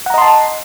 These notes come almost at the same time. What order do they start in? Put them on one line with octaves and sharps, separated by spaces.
F#5 A#5 D#5 C6 A5